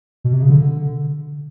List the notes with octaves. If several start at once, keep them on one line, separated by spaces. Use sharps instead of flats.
B2
C3
C#3
D3